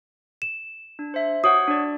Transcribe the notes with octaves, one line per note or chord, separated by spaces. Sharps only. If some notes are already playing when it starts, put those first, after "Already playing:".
E7
D4
C5 E5
F#4 C#5 F#5 D#6
D4 D5